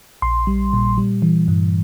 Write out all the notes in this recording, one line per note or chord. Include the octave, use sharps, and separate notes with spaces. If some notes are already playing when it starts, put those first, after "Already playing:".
A#1 C6
G3
A#2
G3
E3
G2